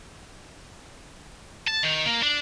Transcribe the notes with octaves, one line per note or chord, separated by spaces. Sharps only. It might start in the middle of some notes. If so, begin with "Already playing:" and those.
A5
D#3
A#3
D4